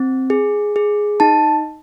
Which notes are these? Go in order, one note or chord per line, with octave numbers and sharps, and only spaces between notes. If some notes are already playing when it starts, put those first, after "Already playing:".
Already playing: C4
G#4
G#4
D#4 A5